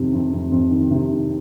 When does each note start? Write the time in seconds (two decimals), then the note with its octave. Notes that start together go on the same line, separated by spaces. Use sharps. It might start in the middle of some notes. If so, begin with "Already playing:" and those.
Already playing: F2 C3 D#3
0.13 F2
0.33 F2
0.52 F2
0.71 D#3
0.91 C3
1.11 D#3